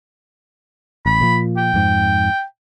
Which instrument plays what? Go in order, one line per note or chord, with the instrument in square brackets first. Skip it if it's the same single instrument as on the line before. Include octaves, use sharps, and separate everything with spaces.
[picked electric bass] A1 [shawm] B5
[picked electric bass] A#2 F3
[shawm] G5
[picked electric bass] F2 G#2